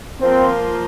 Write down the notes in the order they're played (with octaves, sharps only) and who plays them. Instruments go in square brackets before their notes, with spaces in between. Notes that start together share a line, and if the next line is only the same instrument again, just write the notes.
[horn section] F3 A#3 F4 A#4 [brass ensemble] C4